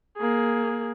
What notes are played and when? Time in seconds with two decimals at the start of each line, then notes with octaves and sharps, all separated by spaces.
0.17 A#3 G#4